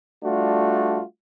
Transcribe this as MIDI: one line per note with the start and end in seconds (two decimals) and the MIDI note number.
0.24 1.02 55
0.24 1.02 57
0.24 1.02 62
0.24 1.02 65
0.24 1.02 66